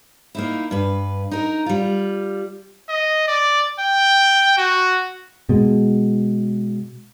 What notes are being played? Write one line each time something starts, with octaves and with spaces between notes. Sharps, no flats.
A#3 D#4 E4
G2 B4
D#4 A#4
G3 F4
D#5
D5
G5
F#4
B2 G#3